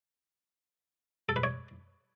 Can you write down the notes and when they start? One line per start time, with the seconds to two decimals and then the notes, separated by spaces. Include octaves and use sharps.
1.29 A4
1.36 B4
1.44 C#5